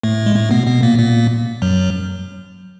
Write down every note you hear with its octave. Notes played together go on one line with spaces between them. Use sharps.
A2 A3
G#3
A2 A3
B2 B3
B2 B3
A#2 A#3
A#2 A#3
F#2 F#3